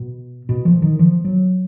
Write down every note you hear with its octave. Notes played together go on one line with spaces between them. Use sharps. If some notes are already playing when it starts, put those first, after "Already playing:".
Already playing: B2
B2
F3
D#3
F3
F#3